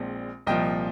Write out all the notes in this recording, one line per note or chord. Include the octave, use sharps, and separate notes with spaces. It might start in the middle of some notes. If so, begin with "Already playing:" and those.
Already playing: A#1 A#2 G#3 C4
C2 A#2 F3 D#5 G5